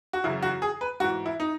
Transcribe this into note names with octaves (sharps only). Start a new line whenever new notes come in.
F#4
F#2 C#3 E3 E4
F#4
G#4
B4
G#2 E3 F#4
E4
D#4